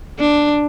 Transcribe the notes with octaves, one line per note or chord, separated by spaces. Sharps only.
D4